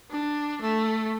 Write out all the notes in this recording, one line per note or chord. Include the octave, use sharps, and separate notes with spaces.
D4
A3